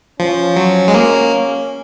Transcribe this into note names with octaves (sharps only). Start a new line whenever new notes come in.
F3 C#4
F#3
G#3
A#3